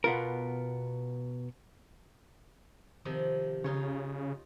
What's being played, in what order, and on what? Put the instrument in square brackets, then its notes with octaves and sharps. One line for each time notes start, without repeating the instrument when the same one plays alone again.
[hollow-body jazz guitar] B2 B3 F4 A#4
[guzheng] C3 D#3 F3
[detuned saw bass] C#3 [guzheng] D#4 F4 C#5